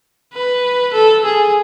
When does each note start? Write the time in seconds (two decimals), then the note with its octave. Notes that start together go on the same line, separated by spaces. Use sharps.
0.34 B4
0.93 A4
1.25 G#4